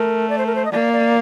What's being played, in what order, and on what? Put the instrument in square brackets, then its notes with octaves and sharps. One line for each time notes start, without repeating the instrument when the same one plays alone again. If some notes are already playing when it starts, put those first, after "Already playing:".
Already playing: [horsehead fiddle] A3 [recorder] A#4
[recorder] D5
C5
A#4
C5
D#5
[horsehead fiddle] A#3 [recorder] D5
[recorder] D5